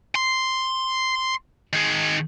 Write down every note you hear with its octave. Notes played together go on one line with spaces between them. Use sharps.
C6
D#3 G#4